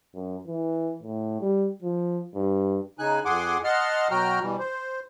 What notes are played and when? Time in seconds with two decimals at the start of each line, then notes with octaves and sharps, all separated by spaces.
0.15 F#2
0.47 E3
1.03 A2
1.41 G3
1.82 F3
2.35 G2
2.99 C#3 D#4 G#5 F#6
3.25 F2 G#4 F#5 G#5 C6 D6
3.64 D#5 F#5 A5 C6 F6
4.11 B2 F#3 F#4 G5 A#5 F6
4.42 B2 E3 G3
4.59 C5